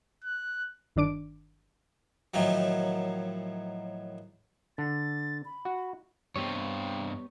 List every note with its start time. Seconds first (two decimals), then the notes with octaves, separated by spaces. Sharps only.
0.24 F#6
0.96 G1 D#3 D4 D6 D7
2.34 A2 D#3 F3 F#3
4.78 D3 A6
5.45 B5
5.65 F#4
6.36 G2 B3 C4 G4 C#5